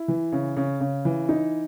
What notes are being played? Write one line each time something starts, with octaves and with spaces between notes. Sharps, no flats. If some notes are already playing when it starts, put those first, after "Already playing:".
Already playing: E4
E3
C#3
C#3
C#3
E3
D#4